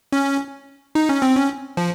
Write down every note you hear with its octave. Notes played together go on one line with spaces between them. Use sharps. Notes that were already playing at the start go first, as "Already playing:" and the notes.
C#4
D#4
C#4
C4
C#4
F3